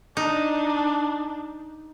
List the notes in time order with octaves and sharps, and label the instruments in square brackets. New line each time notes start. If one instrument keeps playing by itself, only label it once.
[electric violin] D4 [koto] D#4